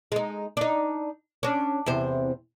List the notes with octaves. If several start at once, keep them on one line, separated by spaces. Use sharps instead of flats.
G#3 D#4
D4 D#4
C#4 D4
E2 C3 C5